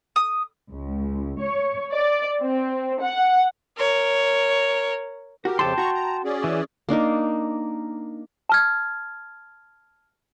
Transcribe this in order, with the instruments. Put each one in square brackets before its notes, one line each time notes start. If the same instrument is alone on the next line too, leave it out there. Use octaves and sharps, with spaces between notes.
[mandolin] D#6
[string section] C#2
C#5
D5
C4
F#5
[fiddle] A#4 C#5
[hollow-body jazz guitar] F#4 [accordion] G4 A#4
[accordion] F2 C#3 F3 [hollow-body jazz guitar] G4 A4 [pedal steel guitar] G5 A5 C6
[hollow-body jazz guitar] F#4 [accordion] A#5 C#6
[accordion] A#5
C#4 G#4 D5
[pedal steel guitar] E3
[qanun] A#3 D4 D#4 A#4
[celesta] A5 F6 G#6